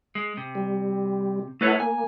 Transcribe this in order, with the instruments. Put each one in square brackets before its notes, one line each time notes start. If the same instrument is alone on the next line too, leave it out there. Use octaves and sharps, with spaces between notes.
[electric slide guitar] G#3
C3
[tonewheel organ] G3
[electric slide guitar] A3 B4 C#5 [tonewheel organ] E4 A4 F#5
[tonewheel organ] A#3 [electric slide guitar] G#5